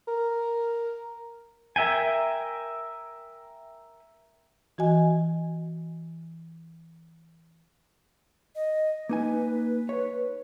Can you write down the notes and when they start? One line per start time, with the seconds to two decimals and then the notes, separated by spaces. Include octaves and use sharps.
0.08 A#4
1.76 A#4 E5 G5 G#5
4.78 E3 F#4 D#5 G#5
8.56 D#5
9.09 A#3 D#4 B4 G#5
9.89 C#5